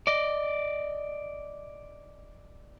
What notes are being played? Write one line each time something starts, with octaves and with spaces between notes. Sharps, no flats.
D5 D#5